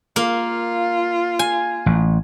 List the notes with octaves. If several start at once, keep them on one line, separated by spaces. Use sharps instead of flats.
A#3 F4
G#5
A1